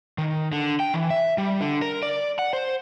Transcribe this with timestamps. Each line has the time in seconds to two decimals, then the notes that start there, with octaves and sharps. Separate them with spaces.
0.18 D#3
0.52 D3
0.80 G5
0.94 E3
1.10 E5
1.38 G3
1.61 D3
1.82 A#4
2.03 D5
2.39 F#5
2.53 C5